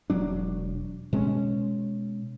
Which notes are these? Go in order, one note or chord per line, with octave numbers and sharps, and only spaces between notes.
E1 F#3 D4
B2 G#3 C#4